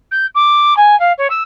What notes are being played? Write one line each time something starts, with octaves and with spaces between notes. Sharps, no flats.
G6
D6
G#5
F5
C#5
E6